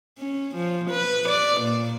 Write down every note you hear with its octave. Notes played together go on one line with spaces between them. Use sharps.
C#4
F3
B4
D5
A#2